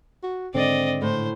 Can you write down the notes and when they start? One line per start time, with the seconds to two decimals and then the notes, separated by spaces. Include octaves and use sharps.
0.23 F#4
0.54 G#2 D3 D#3 C4 D5 D#5
1.02 A2 C5